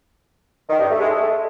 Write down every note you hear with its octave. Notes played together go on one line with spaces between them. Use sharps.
D#3
G2
A3
G#3
A3